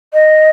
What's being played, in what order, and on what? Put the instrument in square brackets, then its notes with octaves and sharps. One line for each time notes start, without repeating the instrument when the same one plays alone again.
[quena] D#5